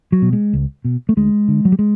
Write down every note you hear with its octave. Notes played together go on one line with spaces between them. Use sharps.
F#3
B2
G#3
C#2
B2
A3
D2 G#3
D3
F#3
G3
G#3